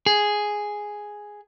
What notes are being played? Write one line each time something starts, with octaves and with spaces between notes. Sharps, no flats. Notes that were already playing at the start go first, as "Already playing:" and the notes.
G#4